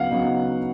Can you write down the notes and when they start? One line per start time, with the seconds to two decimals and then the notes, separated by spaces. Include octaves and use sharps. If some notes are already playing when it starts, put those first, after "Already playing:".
Already playing: C#3 F#3 B3 D#4 F5 F#5
0.11 C#3 F#3 B3 D#4